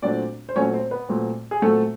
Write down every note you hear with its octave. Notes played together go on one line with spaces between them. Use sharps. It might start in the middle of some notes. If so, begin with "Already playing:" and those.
A#2 F#3 A3 C4 D4 D5
C5
A#2 F#3 A3 C4 C#4 C#5
C4 C5
B3 B4
A#2 F#3 A3 C4
G#4
A#2 F#3 A3 C4 A4